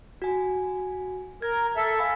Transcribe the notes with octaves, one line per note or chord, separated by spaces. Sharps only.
F#4 G#5
A#4 G#6
A4 E5
F5 G#5 B5